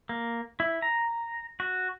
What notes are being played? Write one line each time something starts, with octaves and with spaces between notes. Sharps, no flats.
A#3
E4
A#5
F#4